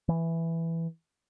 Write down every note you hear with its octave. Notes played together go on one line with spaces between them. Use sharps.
E3